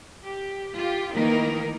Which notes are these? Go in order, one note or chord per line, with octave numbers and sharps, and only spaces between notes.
G4
F4 G4
D#3 E3 A3 A#3 D#4 A#4